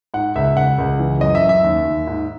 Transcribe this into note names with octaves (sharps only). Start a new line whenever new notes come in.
G#2 F#5
C#2 E5
C#2 F#5
C#2
E3
F#2 D#5
E5
F#2
E5
D#2
D#2
G#2